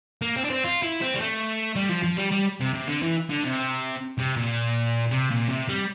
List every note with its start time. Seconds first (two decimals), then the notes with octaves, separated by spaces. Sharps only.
0.22 A#3
0.37 C4
0.45 D4
0.50 C4
0.64 F4
0.83 E4
1.01 C4
1.15 G3
1.20 A3
1.76 G3
1.90 F3
2.04 F3
2.18 G3
2.32 G3
2.60 C3
2.74 C3
2.88 D3
3.02 E3
3.30 D3
3.44 C3
4.19 C3
4.37 A#2
5.12 C3
5.31 A#2
5.49 C3
5.68 G3